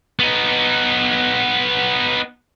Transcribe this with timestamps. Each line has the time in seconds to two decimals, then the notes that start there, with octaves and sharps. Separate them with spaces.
0.19 B3 D#4